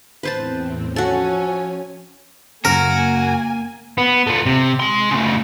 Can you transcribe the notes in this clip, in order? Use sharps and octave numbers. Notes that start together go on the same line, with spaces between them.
E2 A2 C4 B4 C5 A5
F3 C#4 F#4 A4 G#5
F#2 C#3 A#3 F#4 A#4 G#5
B3
A3 F4
C3
G#3 C6
C#3 A3